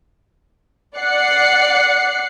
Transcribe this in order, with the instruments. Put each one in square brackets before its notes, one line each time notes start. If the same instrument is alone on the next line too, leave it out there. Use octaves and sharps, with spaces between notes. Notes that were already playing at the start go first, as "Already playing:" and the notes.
[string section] D5 F#5 F#6 C7 C#7